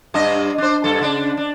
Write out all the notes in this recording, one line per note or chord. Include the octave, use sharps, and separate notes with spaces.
G2 D4 D#5
D4 C5
G2 A4
C#3 D4
D4